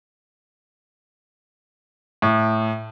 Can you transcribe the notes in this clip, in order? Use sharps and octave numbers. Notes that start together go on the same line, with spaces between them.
A2